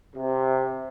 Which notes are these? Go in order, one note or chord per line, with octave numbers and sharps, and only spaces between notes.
C3